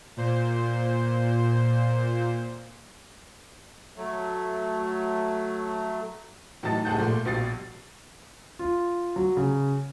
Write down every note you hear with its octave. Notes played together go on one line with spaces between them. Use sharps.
A#2 C5
F#3 A3
A2 E3 F#3 D#4 A5 A6
C2 A2 G#4 F#5 A5 G6
A#2 F3 A3 C6
A#1 B2 G3 A6 C7
F4
F#3
C#3